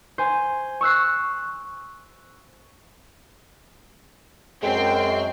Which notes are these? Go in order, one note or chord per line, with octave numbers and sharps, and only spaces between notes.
C5 G#5
C#6 E6 F#6 C7
F#2 G#3 C4 G5 C7